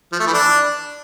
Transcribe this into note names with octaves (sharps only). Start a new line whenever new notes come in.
F3
A3
E3
D4